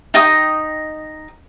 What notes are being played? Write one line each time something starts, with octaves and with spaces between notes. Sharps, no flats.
D#4 D#5 G5 D#6